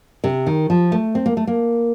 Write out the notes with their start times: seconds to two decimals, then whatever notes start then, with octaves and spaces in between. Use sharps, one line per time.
0.24 C3
0.47 D#3
0.70 F3
0.92 A3
1.15 C4
1.26 A#3
1.37 A3
1.47 A#3